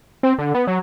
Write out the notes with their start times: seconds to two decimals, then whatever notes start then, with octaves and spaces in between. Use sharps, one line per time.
0.23 C4
0.39 D3
0.54 B3
0.67 F#3